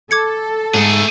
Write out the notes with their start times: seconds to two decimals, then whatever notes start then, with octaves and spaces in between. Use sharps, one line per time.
0.11 A4 D6 G#6 C#7
0.74 G#2 A3 G#4